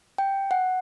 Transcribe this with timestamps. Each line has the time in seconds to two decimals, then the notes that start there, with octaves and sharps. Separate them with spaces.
0.18 G5
0.51 F#5